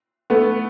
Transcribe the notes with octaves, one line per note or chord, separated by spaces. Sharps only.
A3 B3